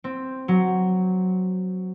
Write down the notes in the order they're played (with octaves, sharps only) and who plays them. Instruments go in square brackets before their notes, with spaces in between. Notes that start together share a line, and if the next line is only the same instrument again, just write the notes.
[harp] C4
F#3